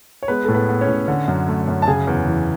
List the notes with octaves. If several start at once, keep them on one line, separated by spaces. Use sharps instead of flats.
C#5
G#3 B3 B4
A2 A4
B3 B4
B3
C#4 C#5
A2
D3
F#2
A3
F#2
A5
C#3 G#4 G#5
E2
E3